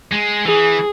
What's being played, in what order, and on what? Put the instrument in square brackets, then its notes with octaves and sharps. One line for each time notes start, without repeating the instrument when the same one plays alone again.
[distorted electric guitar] G#3
[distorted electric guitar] E3 [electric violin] G#4